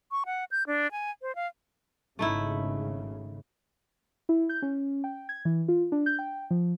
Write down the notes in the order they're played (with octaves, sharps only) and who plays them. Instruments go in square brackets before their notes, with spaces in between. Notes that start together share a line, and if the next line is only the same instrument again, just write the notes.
[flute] C#6
F#5
G6
D4
G#5
C5
F5
[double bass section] G#1 C#3 [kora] A3 D#4 E4
[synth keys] E4
G6
C#4
G5
G#6
E3
F4
D4
G6
G5
F3